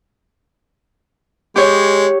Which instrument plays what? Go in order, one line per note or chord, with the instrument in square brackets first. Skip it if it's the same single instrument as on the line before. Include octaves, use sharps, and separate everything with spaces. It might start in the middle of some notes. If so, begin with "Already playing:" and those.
[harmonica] G#3 [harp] G4 C#5